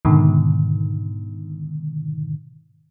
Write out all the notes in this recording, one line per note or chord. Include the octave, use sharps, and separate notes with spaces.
G#2 B2 D3 D#3